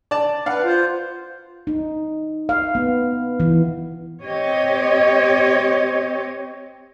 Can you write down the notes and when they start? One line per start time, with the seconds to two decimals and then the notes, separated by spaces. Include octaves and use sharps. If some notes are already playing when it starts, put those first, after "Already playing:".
0.11 D5 A5
0.46 B4 D5 F5 F#5
0.64 F4 C5
1.67 D#4
2.49 F5
2.75 B3
3.40 E3
4.21 C4 G4 C#5 D#5